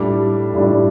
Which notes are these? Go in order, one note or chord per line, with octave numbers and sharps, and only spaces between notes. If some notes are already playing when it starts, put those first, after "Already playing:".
Already playing: A2 G3 D4 D6
A2 G3 D4